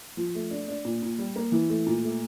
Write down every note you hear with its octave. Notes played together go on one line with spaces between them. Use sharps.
F3
A3
D4
D4
A#2
A#2
G3
A#3
E3
A3
A#2
A3